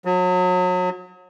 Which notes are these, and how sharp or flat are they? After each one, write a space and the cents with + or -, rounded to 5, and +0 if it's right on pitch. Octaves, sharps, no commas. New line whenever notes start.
F#3 -30